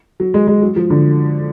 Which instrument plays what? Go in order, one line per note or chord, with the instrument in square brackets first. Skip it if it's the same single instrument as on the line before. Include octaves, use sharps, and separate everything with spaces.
[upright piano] F#3
G#3
G#3
F#3
F3
D3